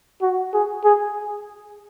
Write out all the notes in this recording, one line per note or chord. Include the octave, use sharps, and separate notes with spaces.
F#4
G#4
G#4